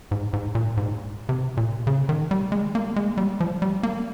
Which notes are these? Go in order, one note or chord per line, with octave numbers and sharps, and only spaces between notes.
G#2
G#2
A#2
G#2
C3
A#2
C#3
D#3
G3
G#3
A#3
G#3
G3
F3
G3
A#3